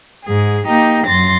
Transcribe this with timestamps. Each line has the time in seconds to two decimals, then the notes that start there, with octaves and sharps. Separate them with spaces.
0.24 G#2 G#4
0.65 A#3 D#4 G4
1.06 F#2 C6 A6 A#6